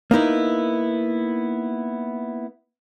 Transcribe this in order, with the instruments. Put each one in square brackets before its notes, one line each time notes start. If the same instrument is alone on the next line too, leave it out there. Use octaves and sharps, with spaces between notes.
[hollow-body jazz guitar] A#3 B3 D#4 E4